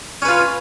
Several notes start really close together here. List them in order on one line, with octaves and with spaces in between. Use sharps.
C#4 B4 F4